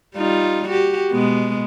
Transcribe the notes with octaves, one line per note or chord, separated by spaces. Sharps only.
G3 D#4 F4
F#4 G4
B2 G#3 B3